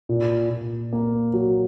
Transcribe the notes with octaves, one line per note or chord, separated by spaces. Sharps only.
A#2
A#2
A#3
F#3